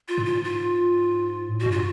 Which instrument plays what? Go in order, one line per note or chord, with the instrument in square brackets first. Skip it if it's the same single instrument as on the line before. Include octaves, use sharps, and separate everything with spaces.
[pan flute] F4
[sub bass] G#2
[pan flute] F4
F4
[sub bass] A2
[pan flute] F#4
[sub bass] G2
[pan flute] F4